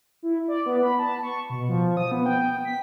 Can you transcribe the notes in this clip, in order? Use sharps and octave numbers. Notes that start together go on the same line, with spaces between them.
E4
D5
B3
B5
A5
C#6
B2
F3
D#6
B3
G5
B6